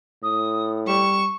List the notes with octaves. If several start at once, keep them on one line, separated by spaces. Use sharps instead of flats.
A2 D#6
G3 C#6 E7